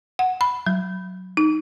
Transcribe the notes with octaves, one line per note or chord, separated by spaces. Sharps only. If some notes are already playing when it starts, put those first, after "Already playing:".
F#5
B5
F#3
D#4